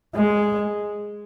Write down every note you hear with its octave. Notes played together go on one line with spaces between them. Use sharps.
G#3